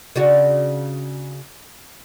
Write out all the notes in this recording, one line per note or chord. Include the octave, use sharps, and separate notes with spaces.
C#3 D4 F#4